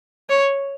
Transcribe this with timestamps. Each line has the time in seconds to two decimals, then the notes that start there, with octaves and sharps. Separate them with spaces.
0.29 C#5